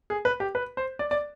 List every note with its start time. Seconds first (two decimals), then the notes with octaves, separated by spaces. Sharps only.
0.10 G#4
0.25 B4
0.40 G4
0.55 B4
0.77 C5
0.99 D5
1.11 D5